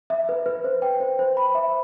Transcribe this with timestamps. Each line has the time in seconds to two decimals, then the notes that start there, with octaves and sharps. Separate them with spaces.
0.10 E5
0.29 B4
0.46 B4
0.64 C5
0.82 G5
1.00 C5
1.19 C5
1.37 B5
1.55 E5